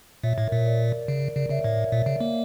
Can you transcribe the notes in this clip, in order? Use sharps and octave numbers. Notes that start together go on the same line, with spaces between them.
A#2 C#5 E5
A2
A#4
A#2 C#5
A#4 D5
C#3
C#3 A#4 D5
C#3 C#5 E5
A2 C#5 E5
A#2
C#3
A#3